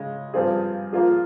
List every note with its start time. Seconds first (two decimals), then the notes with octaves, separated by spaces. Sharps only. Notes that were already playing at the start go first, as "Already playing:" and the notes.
Already playing: C#3 G#3 C#4
0.34 G2 F3 C4 F4 G#4
0.93 F3 A#3 F4 G#4